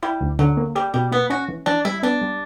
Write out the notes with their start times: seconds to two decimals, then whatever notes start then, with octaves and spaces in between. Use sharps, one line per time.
0.03 G3 E4
0.21 D2
0.39 D3 F#3
0.57 A#3
0.75 G3 G4
0.94 B2 G3
1.12 A#3 B3
1.30 C#4 F#4
1.48 E3
1.66 E3 D4
1.85 G3 E4
2.03 B3 D4
2.22 G3